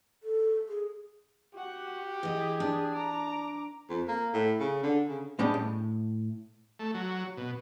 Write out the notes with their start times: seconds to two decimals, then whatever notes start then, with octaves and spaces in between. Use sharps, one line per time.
0.23 A4
0.69 G#4
1.54 F#4 G4 F#5
2.23 E3 G#4 D#5
2.60 D4
2.94 A#5 D6
3.89 F2
4.08 A#3
4.33 A2
4.60 C#3
4.83 D3
5.09 C#3
5.39 A2 G3 G#3 C#4 D4
5.54 A2
6.79 A3
6.94 F#3
7.37 B2